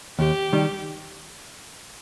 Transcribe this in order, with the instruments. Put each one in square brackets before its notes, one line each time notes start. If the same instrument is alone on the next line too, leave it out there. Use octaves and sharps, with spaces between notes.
[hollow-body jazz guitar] D#2 [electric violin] G4
[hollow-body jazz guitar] D#3 G3